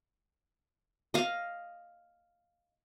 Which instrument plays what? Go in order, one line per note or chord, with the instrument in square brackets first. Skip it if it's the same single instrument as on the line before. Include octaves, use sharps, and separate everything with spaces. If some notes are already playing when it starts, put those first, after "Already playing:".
[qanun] D#5 F5